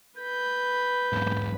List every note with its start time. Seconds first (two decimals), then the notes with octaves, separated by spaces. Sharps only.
0.19 B4 B5 G6
1.13 B1 G#2